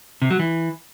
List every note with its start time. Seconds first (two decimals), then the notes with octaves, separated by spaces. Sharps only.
0.22 C3
0.31 F#3
0.39 E3